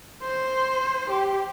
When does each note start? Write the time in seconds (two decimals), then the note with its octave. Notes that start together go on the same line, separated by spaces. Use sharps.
0.23 C5
1.10 G4